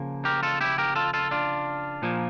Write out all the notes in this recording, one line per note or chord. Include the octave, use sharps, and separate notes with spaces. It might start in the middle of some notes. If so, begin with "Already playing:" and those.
Already playing: C#3 F3 A#3
G4 A#4
F4 A4
E4 G4
G4 A#4
F4 A4
F4 A4
D4 F4
A#2 F3 A#3